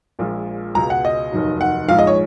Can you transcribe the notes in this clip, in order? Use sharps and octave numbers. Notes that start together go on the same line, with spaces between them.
A#1 A#2 F3 G#3
C#2 B2 G#3 A#5
F#5
D#5
F1 D#2 D#3 F#3
F#5
A#1 G#2 F3 G#3 F5
D#5
C#5